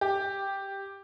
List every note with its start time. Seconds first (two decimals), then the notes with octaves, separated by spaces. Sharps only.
0.01 G4